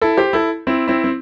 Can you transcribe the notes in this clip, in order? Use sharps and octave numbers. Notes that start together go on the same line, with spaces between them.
E4 A4
G4 C5
E4 A4
C4 E4
C4 E4
C4